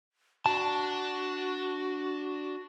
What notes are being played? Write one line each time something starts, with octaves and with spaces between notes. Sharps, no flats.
D4 F#4 A5